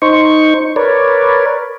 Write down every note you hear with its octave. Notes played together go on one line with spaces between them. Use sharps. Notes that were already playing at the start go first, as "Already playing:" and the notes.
D#4 C5 C#6
A#4 B4 C#5 D5